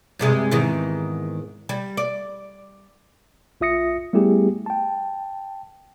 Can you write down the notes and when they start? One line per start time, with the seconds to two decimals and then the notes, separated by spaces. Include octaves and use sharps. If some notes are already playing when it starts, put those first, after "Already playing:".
0.19 G2 C3 G#3
0.51 E2 G#2 D#3
1.69 G3
1.97 D5
3.61 B1 F4 E5 D#6 A#6 C#7
4.13 G3 A3 B3 E4 G4 G#4
4.66 G5 A5